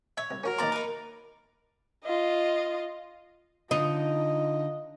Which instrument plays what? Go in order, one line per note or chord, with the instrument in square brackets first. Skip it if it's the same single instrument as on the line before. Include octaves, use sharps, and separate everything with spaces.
[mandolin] C#5 [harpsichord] E5
[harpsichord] C2
[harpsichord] C#4 F#4 A#5 [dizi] A#4
[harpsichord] D#3 A#3 C6 [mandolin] D5 A#5
[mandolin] D#4 B4
[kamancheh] F4 D#5
[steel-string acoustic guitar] D3 [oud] D#4 [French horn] F4 [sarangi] D#5